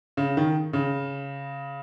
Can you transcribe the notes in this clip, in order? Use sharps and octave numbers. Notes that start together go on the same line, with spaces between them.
C#3
D#3
C#3